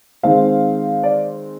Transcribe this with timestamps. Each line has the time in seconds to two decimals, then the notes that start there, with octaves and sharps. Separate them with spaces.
0.23 D#3 G#3 C4 F5
1.03 D5